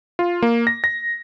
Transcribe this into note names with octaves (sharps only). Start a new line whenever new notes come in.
F4
A#3
A#6
A#6